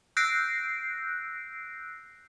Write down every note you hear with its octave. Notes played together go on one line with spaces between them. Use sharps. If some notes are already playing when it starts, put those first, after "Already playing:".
E6 F#6 G6 A#6 C7 D7